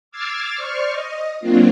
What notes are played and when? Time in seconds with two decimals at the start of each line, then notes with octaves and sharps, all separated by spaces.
0.11 D6 E6 F6 G#6 A6 C7
0.55 C5 D5 C#6 F6
0.91 D#5
1.40 F#3 A#3 C4 D4 F4